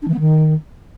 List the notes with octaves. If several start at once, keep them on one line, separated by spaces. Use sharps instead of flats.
D4
E3
B3
D#3